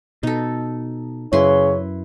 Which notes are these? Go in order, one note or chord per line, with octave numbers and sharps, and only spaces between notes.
B2 D#4 A4
F#2 C#3 E4 B4 C#5 C6